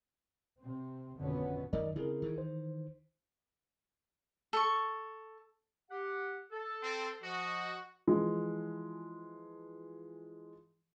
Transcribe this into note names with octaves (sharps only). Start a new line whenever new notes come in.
C3 C4
G#1 F2 B2 D3 B3 C#4
F#2 D#3 A#4 D5 D#5
C#3 C4 E4 G#4 A#4
D#3 E3
C5
A4 C#6
G4 F#5
A4
C4
F3 F#4 D#5
E3 F3 G#3